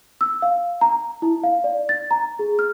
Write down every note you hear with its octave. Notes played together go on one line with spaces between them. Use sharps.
E6
F5
A#5
E4
F5
D5
A6
A#5
G#4
F6